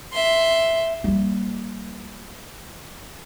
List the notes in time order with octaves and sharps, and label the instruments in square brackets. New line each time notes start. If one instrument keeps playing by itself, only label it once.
[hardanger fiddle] E5 C6
[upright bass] G3 A#3